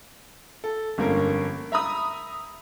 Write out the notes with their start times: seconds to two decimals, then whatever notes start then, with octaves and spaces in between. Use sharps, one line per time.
0.64 A4
0.98 G1 F2 D3 A#3 C#4 A#4
1.72 E5 A#5 B5 D#6